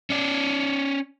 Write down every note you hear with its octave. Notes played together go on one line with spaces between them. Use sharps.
C#4 D5